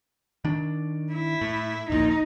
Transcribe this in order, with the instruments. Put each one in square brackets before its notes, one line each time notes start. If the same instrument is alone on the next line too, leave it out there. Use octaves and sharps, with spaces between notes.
[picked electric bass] D#3 D4
[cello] E4
[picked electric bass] A2
[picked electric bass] D1 A#1 A#2 [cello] D#4